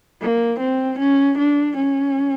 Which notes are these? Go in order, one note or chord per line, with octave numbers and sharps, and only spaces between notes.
A#3
C4
C#4
D4
C#4